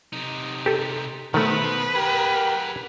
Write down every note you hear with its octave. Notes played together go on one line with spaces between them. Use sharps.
C3 D#4
G4 A4
B2 D#3 A3 B3 B4 C5
G4 G#4 A#4 F#5